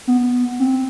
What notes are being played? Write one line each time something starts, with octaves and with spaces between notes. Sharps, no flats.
B3
C4